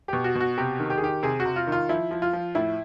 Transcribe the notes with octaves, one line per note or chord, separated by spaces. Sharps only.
B2 G4
F#4
B2
F#4
C3 G4
D#3
G4
G#4
D#3 G4
C3 G#4
F#4
C3
F4
D#3
F4
F3 E4
F3
F4
F3
A2 E4